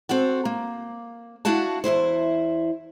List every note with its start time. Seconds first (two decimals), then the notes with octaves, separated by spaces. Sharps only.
0.09 C4 F#4 A4 F#5
0.45 A#3
1.45 D4 E4 F#4 F5 F#5 A5
1.84 E2 G#2 E4 C5